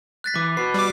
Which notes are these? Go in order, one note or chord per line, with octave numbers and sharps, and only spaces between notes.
F#6 A6 B6
E3 D6
F#4 B4 C7
G3 D6